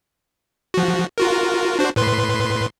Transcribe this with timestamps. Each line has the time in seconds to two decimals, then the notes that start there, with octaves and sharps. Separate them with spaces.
0.74 F3 F#4
1.18 F4 F#4 A#4
1.79 D4 F#4 C5
1.96 A2 B4 C6